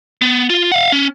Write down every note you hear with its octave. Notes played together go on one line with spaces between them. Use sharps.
B3
F4
F5 F#5
C#4